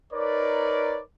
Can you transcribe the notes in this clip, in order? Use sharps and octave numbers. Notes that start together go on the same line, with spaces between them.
D#4 A#4 B4 C#5 D5